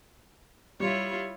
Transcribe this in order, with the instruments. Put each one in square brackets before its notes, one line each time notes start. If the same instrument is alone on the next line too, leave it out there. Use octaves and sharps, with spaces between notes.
[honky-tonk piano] G3 [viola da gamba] E4 F4 C#5